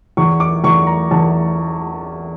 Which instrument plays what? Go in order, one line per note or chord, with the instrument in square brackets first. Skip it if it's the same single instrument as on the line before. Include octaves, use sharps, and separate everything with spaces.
[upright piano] E2 C#6
D6
E2 C#6
A#5
E2 A5